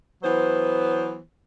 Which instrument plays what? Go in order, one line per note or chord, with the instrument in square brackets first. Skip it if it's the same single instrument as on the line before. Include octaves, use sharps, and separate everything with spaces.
[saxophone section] E3 F#3 B3 C5